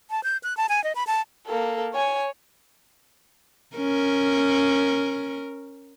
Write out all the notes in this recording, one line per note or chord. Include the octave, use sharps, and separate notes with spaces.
A5
G6
F#6
A5
G#5
D#5
B5
A5
A#3 A4
C#5 G#5
C#4 A#4